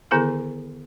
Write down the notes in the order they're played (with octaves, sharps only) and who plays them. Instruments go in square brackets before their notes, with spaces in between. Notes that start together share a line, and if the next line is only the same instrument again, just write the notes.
[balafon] D3 D#3 B3 E4 G#4 A4